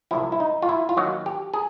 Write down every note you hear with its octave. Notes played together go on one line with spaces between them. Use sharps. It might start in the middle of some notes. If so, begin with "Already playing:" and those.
C2 C3 F3 E4
E4
D#4
F4
E4
F4
D#2 D#3 F#3 F#4
G4
G#4